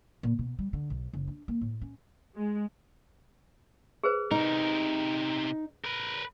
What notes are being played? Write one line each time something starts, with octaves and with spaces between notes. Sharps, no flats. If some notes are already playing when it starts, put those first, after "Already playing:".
A#2
B2
G3
D3
B1
F#1
D4
A#3
A2
C#4
G#3
G#4 B4 C5
C3 D#4 A#4
A#4 B4